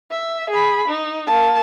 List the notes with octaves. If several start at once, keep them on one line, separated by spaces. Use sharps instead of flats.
E5
G#4 B5
D#4
A#3 A5